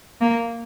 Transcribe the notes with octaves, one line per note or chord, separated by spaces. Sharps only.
A#3